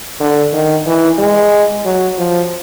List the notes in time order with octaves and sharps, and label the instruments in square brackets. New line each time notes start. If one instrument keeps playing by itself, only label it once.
[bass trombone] D3
D#3
E3
G#3
F#3
F3